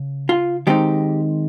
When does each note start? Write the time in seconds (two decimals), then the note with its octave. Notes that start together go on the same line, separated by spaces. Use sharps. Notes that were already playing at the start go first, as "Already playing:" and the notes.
Already playing: C#3
0.29 F4
0.67 D#3 G#3 C4 D#4 G4